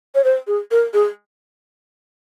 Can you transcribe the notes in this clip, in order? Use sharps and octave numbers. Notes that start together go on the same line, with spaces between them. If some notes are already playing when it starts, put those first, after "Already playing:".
C#5
C5
G#4
A#4
G#4